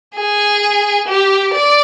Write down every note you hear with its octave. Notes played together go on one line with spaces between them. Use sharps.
G#4
G4
D5